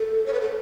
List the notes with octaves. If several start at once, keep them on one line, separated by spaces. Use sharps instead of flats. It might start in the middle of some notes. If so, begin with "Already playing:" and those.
Already playing: A4
C#5
B4
A4